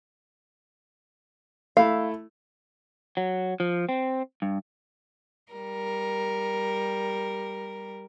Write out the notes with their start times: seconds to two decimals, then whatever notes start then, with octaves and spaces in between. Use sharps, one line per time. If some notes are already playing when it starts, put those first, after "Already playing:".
1.77 A3 E4 F5
3.17 F#3
3.60 F3
3.89 C4
4.42 G2
5.53 G3 A#4